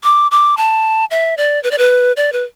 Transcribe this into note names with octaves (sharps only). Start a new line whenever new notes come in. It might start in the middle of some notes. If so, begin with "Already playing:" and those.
D6
D6
A5
E5
D5
B4
D5
B4
D5
B4